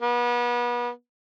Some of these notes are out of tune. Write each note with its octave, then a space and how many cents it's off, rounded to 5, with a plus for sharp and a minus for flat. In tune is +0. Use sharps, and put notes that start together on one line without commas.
B3 -35